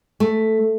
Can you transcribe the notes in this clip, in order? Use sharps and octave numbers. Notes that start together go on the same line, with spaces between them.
A3